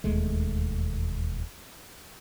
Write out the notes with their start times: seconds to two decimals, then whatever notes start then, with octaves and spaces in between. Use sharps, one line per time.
0.04 E1 D#2 G#3 A3